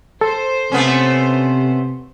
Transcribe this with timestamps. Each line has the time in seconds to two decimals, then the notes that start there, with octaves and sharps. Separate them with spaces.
0.21 A4 C5
0.72 C3 A3 B3 C#4